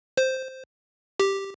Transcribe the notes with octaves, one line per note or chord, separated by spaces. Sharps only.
C5
G4